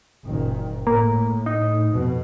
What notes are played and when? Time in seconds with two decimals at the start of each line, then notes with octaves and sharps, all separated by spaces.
0.25 F#1 A#2 D#3
0.87 A2 A#3
1.46 D#4
1.93 F2 B2